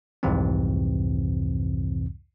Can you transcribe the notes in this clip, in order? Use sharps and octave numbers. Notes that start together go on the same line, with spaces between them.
C2 F2 G#2 C3 E3 C4